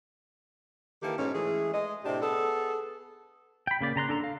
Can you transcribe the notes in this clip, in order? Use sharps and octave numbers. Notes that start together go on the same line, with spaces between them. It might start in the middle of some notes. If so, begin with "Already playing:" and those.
D#3 E3 A#3 G4 A4
G#2 B2 C#4
E3 G#3 A3 G#4
G#3 D#5
A2 C3 D4 G4
B3 G#4 A4
G5 B5
C#3 A#3 D5
C#3 A#5 C6 F#6
D4 A4 A#5
F5